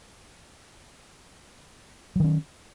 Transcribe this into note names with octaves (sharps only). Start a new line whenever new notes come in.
D#3 F#3 C#4